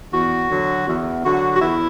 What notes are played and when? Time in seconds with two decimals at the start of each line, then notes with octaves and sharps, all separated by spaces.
0.13 E2 F#4
0.50 D3 F#3
0.87 E2
1.24 D3 F#3 F#4
1.56 F#4
1.61 E2 E4